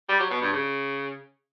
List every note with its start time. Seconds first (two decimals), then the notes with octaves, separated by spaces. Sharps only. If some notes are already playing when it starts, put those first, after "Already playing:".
0.09 G3
0.20 F#3
0.31 B2
0.42 G2
0.53 C#3